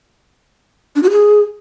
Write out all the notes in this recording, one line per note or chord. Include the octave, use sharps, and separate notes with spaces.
D4
F#4
G#4